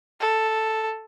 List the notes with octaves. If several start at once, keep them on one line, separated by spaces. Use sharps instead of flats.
A4